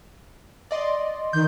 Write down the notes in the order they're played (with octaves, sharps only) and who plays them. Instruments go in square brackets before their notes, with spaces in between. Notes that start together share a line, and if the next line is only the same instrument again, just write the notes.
[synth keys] D5 D#5 C6
[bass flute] D#3 [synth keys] G6